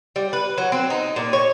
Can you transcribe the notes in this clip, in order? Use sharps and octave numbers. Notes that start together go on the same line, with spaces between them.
G3
B4
F#3
C4
D#4
A#2
C#5